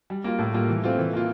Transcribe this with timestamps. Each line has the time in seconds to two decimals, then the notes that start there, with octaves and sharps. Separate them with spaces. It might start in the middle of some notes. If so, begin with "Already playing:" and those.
0.10 G3
0.24 A#3 F4
0.39 A2
0.54 G3 A#3 F4
0.69 E3
0.84 A3 C4 F4
0.98 E3
1.13 A#3 F4